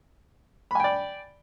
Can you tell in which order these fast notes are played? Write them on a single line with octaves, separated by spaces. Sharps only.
B5 G#5 G5 D5